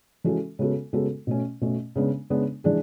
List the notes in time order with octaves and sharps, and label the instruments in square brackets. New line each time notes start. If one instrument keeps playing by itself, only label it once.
[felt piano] E3 G#3 C#4 F#4 A4
C#3 G#3 B3 F#4 A4
C#3 G#3 B3 F#4 A4
B2 A3 C#4
B2 A3 C#4
C#3 G#3 B3 D4
C#3 G#3 B3 D4
E3 G#3 D4 G#4